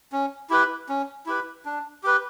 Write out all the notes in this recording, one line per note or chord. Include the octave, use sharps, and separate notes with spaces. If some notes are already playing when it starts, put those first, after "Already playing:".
C#4
E4 G4 B4
C#4
E4 G4 B4
D4
G4 B4